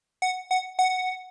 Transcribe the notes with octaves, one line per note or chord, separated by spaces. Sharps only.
F#5
F#5
F#5